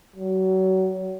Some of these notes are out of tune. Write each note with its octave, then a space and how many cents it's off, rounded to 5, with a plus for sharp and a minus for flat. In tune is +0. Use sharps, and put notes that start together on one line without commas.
F#3 +30